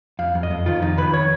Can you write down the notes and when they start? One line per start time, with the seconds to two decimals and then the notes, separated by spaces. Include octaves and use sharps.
0.19 F2 F5
0.35 F2
0.43 D#5
0.51 F2
0.66 D#3 F4
0.82 F2 D#4
0.98 D#3 B4
1.14 C#5